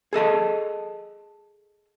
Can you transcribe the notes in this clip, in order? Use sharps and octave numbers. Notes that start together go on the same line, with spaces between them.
G#4 A4 D#5 A5